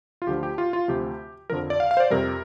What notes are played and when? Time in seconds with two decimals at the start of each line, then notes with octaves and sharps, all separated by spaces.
0.22 F4
0.27 D2 D3 F3 G4
0.43 G4
0.58 F4
0.73 F4
0.88 D2 C3 F3 G4
1.50 F2 D3 F3 A#4
1.70 D5
1.80 F5
1.91 F5
1.97 C5
2.00 D5
2.10 F2 C3 G3 A#4